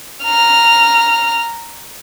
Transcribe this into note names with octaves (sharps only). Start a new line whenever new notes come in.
A#5 F6